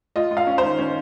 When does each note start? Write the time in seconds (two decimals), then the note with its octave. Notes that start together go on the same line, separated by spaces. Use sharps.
0.16 F4 D#5
0.31 F4
0.37 F5
0.47 C#4
0.58 C5
0.63 D#3
0.79 C#4